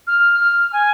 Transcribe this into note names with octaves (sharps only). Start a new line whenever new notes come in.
F6
F6
G#5